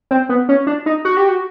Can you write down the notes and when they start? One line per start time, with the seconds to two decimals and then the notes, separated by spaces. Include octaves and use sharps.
0.11 C4
0.29 B3
0.49 C#4
0.67 D4
0.86 D#4
1.05 F#4
1.17 G4
1.28 F#4